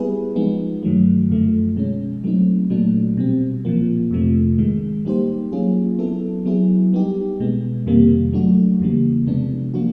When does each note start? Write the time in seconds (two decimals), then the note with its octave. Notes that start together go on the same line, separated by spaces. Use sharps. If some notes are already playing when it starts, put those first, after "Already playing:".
Already playing: G3 B3 E4 G#4 B4
0.36 F3 G#3 B3 D#4
0.83 G2 D#3 F#3 A3
1.30 F#2 D3 F3 A3
1.76 B2 G#3 C#4
2.24 F#3 A3 C4 D#4
2.70 A#2 F#3 A3 D4
3.17 B2 G3 C4
3.65 A#2 F3 A#3
4.11 F2 C3 F3 A3
4.58 G#2 D#3 G#3
5.05 G3 A#3 D#4 G4 C5
5.52 F#3 A#3 C#4 F4 G#4
5.99 F#3 B3 E4 A4
6.45 F#3 B3 E4 G#4
6.93 G3 B3 D#4 G4
7.40 B2 G#3 B3
7.86 F2 C3 D#3 G3 A#3
8.33 F#3 A3 D4 F#4
8.80 E2 C#3 E3 G3 A#3
9.27 C3 F3 G#3 B3 D4
9.74 F3 A#3 D4 F#4